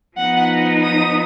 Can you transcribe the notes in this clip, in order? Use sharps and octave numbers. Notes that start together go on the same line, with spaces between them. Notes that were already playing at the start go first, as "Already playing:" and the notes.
F3 B3 D#4 F#5
D#6